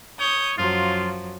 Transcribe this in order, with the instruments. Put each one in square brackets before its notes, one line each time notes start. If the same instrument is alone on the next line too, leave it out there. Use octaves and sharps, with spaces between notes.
[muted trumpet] C#5 [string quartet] D#6 G6
[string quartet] F#2 F3 F#3 [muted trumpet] F4